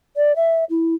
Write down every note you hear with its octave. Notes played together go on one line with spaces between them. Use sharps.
D5
E5
E4